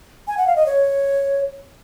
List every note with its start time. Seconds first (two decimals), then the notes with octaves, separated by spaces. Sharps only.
0.28 G#5
0.37 F#5
0.47 F5
0.56 D#5
0.66 C#5